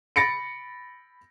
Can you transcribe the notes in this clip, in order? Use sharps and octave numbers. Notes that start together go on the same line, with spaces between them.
B5 A6 A#6 C#7 D7